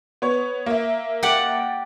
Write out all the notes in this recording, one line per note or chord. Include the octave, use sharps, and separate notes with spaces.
B3 C#5
A#3 E5
G4 D5 F#5